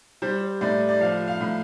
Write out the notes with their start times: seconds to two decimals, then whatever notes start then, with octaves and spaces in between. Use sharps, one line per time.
0.22 G3 C5
0.61 A2 D5
0.89 D5
1.01 F3 F5
1.28 F5
1.41 A2